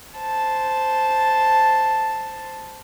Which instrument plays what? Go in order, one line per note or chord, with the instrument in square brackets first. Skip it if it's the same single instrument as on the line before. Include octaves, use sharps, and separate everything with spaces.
[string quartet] C5 A5